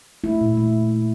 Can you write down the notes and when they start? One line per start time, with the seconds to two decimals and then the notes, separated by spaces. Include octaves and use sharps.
0.24 A3 E4
0.41 A#2
0.57 A3